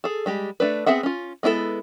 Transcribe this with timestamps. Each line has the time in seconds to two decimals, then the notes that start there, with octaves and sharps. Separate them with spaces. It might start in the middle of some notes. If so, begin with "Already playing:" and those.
0.04 G#4 A4
0.26 G3 G#3 G4
0.60 A3 D4 B4
0.86 B3 C4 G#4 E5 F#5
1.03 C#4 F4
1.43 G#3 B3 E4 F#4 A4